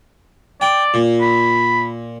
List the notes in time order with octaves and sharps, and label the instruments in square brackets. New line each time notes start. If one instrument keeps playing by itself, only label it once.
[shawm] D5 [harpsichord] G5
[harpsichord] A#2
[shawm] B5